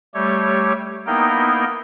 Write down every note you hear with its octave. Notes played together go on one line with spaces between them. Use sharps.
G3 A3 G4 C#5
A#3 B3 D#4 E4 A#4 G5